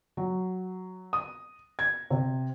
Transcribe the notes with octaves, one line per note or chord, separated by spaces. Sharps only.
F#3
D#6
G#6
C3